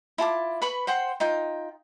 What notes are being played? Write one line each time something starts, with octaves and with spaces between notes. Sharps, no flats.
E4 F4 A5 D6
B4 B5 C#6
C5 F#5 G5 C6
D#4 F4 G5